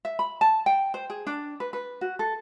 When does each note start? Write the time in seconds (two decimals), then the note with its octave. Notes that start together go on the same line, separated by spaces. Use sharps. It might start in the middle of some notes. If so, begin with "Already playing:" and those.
0.05 E5
0.19 B5
0.41 A5
0.66 G5
0.94 C5
1.10 G#4
1.27 D4
1.60 B4
1.73 B4
2.01 F#4
2.19 A4